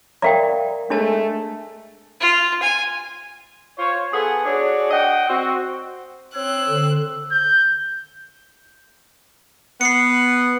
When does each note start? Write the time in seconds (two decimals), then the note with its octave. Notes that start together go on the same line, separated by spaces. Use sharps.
0.22 A#4 D5 E5 F5 G5 A#5
0.90 G#3 A3 D4 D#5 A5
2.21 F4
2.62 G#5
3.78 F4 C5 C#5
4.12 B3 G#4 A4 F#5 G#5
4.45 D4 F#4 G#4 C#5 D5
4.91 D#5 F#5 G5
5.29 C4 F#4
6.35 C4 C#5 E6 F#6
6.68 D3
7.32 G6
9.81 B3 C7 C#7